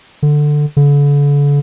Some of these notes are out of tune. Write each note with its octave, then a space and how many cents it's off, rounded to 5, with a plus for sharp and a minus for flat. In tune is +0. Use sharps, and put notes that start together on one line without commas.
D3 +10
D3 -40